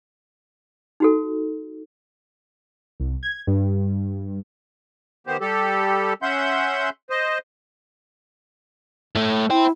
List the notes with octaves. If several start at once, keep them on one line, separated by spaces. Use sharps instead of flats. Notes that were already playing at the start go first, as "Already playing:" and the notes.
D#4 F#4 A4
C2
G#6
G2
D#3 B3 G4 C5
G3 G4 A4
C#4 E5 F#5 C6 G6
C5 D#5
A2 A3
E4 C5 G5